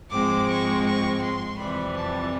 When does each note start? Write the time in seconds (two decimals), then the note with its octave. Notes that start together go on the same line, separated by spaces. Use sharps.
0.10 G#2 F3 G#3 C4 D6
0.47 C#6
0.84 C#6
1.21 C6
1.57 F2 C3 E3 G3 B5
1.95 A5